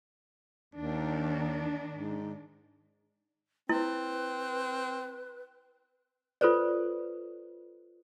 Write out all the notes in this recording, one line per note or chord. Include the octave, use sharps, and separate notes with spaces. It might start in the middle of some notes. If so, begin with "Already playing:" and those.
D#2 D#3 D4
G#2
C4 E4 B4
F4 A4 B4 C5 D5